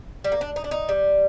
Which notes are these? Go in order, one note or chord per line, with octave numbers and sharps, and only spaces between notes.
G3
A#3
D4
D#4
D4
D#4
G3